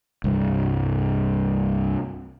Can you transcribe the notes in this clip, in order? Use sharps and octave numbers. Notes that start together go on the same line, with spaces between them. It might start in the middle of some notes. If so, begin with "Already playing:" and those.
C2 G2